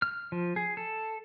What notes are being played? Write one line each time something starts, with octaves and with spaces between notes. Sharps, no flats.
F6
F3
G#4
A4